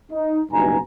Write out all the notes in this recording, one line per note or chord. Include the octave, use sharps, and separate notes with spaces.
D#4
F#1 G2 B2 D#4 G#5 A#5